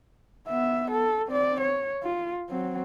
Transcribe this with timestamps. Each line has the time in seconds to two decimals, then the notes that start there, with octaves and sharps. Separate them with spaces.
0.48 B3 E5
0.92 A4
1.27 C4 D5
1.61 C#5
2.03 F4
2.50 F#3 C4